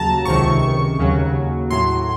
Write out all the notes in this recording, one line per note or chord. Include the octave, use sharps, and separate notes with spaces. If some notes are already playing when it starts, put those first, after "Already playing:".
Already playing: D#2 C#3 F#3 A5 A#5
C#2 C3 D#3 C#6
D#2 C#3 F#3
A2 F#3 C6